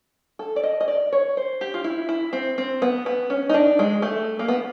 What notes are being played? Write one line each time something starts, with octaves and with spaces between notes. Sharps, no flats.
A4
D5
D#5
D#5
D5
C#5
C5
G4
F4
E4
E4
C4
C4
B3
B3
C#4
D#4
D4
G#3
A3
A#3
B3